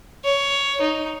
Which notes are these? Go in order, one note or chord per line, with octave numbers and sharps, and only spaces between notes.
C#5
D#4